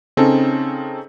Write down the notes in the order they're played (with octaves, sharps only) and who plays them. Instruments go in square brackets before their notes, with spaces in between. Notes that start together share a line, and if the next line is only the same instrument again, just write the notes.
[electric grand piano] C#3 C4 C#4 D#4 A4